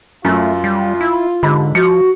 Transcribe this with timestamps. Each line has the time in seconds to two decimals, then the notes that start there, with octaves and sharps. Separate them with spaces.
0.25 F#2 A3 F4
0.64 G3
1.01 E4
1.43 G#2 D3 G4 B5
1.75 F3 F#4 C#7